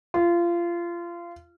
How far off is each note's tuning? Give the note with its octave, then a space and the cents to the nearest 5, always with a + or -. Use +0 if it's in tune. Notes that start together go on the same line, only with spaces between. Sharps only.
F4 -25